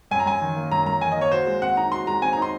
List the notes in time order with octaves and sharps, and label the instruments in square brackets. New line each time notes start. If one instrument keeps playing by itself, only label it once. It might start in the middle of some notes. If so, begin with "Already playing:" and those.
[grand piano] F#2 [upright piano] G#5
[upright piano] A#5
[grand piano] F#2 [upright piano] G#5
[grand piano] D#3
A#3
[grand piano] F#2 [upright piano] A#5
[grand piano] F#2 [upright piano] A#5
[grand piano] D#3 [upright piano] G#5
[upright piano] D#5
[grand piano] A#3 [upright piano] C#5
[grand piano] F#4 [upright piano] C5
[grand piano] G#3
[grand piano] C4 [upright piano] F#5
[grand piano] D#4 [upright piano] A#5
[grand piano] F#4 [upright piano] C6
[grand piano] G#3 [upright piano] A#5
[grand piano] C4 [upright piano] G#5
[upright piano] A#5
[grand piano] D#4 [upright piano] C6